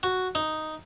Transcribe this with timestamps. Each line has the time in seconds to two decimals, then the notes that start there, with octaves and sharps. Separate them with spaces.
0.03 F#4
0.35 D#4